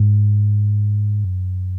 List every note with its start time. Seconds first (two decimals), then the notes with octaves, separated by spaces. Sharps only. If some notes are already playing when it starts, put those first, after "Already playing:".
Already playing: G#2
1.25 F#2